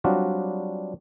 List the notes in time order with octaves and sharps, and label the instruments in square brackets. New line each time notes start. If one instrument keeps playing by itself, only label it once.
[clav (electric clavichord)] F#3 G3 C4 D4 F4 F#4